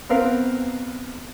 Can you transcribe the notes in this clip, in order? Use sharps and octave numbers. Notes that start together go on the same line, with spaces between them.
B3 C4 A#4 B4 F5